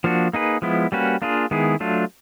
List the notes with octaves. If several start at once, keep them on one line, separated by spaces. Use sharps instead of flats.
F3 A#3 D4 F#4
A#3 D#4 G#4 B4
F3 G#3 B3 E4
G3 A#3 C#4 F#4 B4
A#3 D4 F4 G#4
D#3 G#3 B3 E4 G#4
F#3 A3 D4 F4